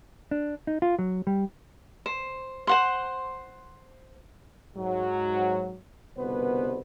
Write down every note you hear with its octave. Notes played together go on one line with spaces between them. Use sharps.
D4
D#4
F4
F#3
G3
C5
C5 F#5 C6
G#2 F#3
G1 C2 B2 B3 B4 C5